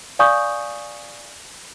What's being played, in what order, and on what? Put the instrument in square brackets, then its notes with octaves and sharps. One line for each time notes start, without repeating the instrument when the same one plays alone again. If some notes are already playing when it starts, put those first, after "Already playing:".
[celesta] D5 F5 G#5 C#6 D#6 G6